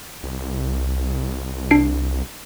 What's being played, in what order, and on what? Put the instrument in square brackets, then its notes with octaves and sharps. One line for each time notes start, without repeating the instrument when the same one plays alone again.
[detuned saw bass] C2
[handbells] D4 C7 D7